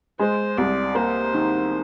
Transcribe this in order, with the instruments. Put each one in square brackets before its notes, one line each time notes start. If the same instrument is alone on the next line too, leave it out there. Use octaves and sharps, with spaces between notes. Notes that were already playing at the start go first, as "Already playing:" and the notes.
[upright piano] G#3 [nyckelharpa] C5
[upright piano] C2 [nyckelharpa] D5
[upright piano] A#3 [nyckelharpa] C5
[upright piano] D#3